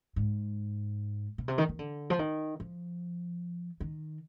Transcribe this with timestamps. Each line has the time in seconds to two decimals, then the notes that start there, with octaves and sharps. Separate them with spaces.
0.16 G#2
1.38 B2
1.48 C3
1.58 D#3
1.69 D#3
1.79 D3
2.10 F3
2.19 D#3
2.60 F3
3.80 D#3